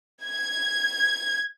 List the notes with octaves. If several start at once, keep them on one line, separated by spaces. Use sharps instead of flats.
G#6